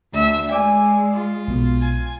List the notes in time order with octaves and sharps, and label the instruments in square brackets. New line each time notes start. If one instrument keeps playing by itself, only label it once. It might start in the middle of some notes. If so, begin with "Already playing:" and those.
[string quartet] D2 [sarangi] E5
[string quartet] G#3 [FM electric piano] D5 D6 E6 [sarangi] G#5
[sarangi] F4
[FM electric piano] B1 B2
[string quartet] G#5